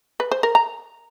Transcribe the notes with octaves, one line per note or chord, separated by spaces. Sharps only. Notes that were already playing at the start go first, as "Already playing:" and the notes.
B4
C5
A#4
A#5